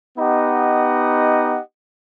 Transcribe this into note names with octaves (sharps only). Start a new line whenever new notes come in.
B3 D#4 G4 D#5 F#5